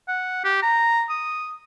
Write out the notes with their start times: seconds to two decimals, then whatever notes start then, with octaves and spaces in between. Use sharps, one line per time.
0.08 F#5
0.44 G4
0.63 A#5
1.10 D#6